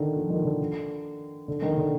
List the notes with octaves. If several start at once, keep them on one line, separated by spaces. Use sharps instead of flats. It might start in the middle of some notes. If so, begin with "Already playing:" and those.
Already playing: D3 D#3
F3
D#3
D3
D3
D#3
D3